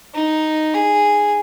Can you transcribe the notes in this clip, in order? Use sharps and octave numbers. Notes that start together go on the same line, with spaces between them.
D#4
G#4